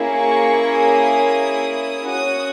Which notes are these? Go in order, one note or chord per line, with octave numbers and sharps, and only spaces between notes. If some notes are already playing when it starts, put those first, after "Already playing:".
Already playing: A#3 C#4 E4 G#4
C#6
D#6
C#4 F#4 D#6